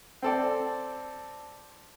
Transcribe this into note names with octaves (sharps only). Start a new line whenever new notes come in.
C4 A4 D5